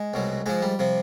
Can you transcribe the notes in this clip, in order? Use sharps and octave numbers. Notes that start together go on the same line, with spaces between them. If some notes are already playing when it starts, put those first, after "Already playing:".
Already playing: G#3
C2 B2 F#3
G#2 F3 G#3
G3
C3 F3